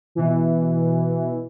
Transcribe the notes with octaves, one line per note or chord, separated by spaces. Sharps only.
B2 E3